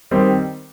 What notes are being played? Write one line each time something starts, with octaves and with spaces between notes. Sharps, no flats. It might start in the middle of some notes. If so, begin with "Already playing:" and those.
D#3 G3 C4